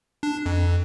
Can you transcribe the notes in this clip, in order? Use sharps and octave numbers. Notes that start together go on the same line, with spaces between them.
D4
F2